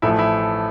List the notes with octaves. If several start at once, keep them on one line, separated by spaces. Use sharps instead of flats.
A1 A2 F3 A3 E4
E4